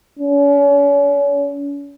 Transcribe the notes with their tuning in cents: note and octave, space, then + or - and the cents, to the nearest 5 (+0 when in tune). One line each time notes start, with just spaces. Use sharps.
C#4 +40